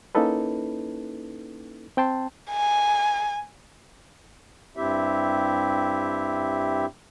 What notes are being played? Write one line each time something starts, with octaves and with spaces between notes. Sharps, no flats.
A#3 C#4 D#4 E4 A4 B4
C4 G5 A5 C6
G#5
G2 C4 E4 G4 E5